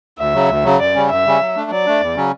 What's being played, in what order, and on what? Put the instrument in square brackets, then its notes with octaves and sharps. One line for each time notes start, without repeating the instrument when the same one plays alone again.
[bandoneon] D2 [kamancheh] E5
[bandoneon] C#3 F#3
D2
C#3 F#3
[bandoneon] F#2 [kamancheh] D5
[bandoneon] C#3 G3 C#4
[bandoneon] F#2 [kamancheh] E5
[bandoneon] C#3 G3 C#4
F#3
A3 D4
[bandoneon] F#3 [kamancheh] D5
[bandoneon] A3 D4
E2
C#3 F#3 C#4